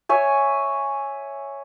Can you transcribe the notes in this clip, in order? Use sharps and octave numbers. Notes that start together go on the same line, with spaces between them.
C#5 E5 G#5